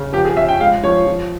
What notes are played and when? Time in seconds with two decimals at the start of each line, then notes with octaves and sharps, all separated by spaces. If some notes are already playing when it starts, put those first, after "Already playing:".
Already playing: C#3
0.13 F3 G4
0.25 G#4
0.36 C#4 E5
0.49 G5
0.60 G#3 F5
0.84 F3 C#5
1.07 F3